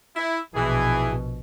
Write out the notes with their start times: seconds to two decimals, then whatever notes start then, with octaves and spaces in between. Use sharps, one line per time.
0.16 E4
0.55 A#1 B2 E3 G#4